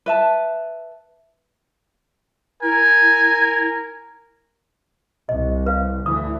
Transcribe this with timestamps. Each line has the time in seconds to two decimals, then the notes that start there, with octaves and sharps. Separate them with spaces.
0.06 B4 E5 A5
2.63 E4 A#4 G#5
5.29 C2 D#5
5.66 B4 F5
6.06 D2 E3 D#6